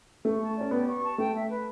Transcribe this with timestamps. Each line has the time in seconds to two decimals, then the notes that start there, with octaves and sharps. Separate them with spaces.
0.25 A3 C#6
0.40 A5
0.56 C#4 D5
0.71 B3 G4
0.87 C#6
1.02 A5
1.18 A3 G5
1.34 E5
1.49 B4